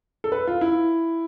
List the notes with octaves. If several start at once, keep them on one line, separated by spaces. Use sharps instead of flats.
A4
B4
F4
E4